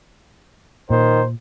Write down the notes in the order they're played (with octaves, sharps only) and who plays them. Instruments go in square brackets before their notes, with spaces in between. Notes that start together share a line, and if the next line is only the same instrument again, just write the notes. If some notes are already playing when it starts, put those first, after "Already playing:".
[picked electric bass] A#2 [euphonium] D#3 [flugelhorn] C5